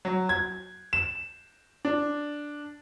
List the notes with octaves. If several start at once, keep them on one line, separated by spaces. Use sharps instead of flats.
F#3
G#6
E7
D4